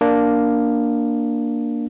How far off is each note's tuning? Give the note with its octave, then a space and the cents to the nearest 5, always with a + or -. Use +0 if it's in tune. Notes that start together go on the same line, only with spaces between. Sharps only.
A#3 +0 D4 +0